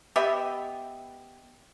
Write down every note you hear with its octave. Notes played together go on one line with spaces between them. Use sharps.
B3 G4 D#5 E5